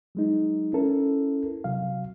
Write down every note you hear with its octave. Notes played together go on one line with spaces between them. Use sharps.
F#3 G#3 D#4
C#4 E4 A4 A#4
C3 F#3 F5